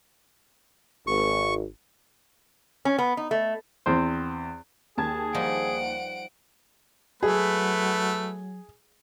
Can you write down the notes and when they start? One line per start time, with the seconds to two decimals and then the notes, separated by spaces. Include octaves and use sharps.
1.07 G#1 C#6
2.85 C#4
2.98 B3
3.17 D#4
3.31 A3
3.86 E2 C4 C5
4.97 D#2 G#4 A5 G#6
5.34 F3 G3 D#4 F#5 D7
7.23 F#3 A3 G#4 B4